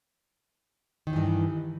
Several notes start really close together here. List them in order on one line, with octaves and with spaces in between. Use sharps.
D#3 E2 E3 G2